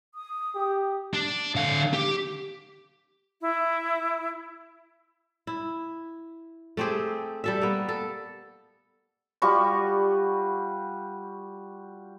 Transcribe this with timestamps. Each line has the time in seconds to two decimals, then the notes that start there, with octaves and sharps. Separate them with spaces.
0.15 D#6
0.55 G4
1.13 D4
1.56 D3 F5
1.94 G4
3.41 E4
5.47 E4
6.77 A3 C4 G4 G#4
7.44 G3 A4 E5
7.62 A#3 B3
7.89 A4
9.42 G3 F4 F#4 C#6